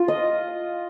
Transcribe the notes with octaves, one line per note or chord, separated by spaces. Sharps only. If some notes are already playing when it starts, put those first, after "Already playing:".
Already playing: F4
D#5